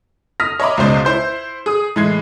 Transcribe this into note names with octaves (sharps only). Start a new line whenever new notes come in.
D#6 F6 A#6 B6
C#5 D#5 E5 A#5 B5 D6
C#2 B2 G#3 C5 D5 D#5
E4 C5 G6
G#4 D#6
A2 E3 G#3 G#6 C7